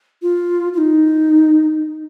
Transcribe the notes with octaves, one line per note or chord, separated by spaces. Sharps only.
F4
F4
D#4